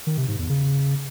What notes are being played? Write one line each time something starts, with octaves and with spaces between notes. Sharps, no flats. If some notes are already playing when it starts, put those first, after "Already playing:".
D#3
C3
G#2
E2
C#3